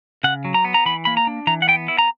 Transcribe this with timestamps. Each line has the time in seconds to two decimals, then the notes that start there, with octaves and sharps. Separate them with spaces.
0.24 C#3 F#5
0.45 F#3
0.54 A#5
0.64 B3
0.74 A#5
0.86 E3 B5
1.05 A#3 B5
1.17 A#5
1.27 D4
1.47 E3 A#5
1.62 F#5
1.67 B3 G5
1.88 E4
1.98 A#5